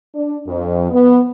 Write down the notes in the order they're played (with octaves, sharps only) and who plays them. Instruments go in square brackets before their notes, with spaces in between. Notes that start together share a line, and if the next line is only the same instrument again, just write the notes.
[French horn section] D4
F2
B3